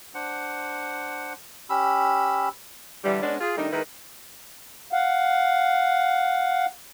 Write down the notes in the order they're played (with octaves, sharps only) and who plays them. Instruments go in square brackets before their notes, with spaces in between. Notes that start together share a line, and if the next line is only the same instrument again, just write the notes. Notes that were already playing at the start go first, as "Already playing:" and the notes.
[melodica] D4 C5 F#5
C#4 G4 B5 E6
[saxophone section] D3 E3 G3
G#3 B3 C#4 D4
F4 G#4
D#3 G3 A3 D4 D#4
D#3 G#3 E4 A#4 B4
[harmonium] F5 F#5